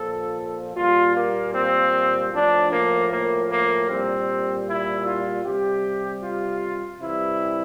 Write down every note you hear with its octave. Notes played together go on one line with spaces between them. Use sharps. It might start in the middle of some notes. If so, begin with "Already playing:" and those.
Already playing: A#2 F3 A4
A#2 G3 F4
A#3
C4
A2 F3 D4
A#3
A#3
A#3
A#2 G3 C4
E4
F4
C3 G3 G4
F4
C3 E3 G3 E4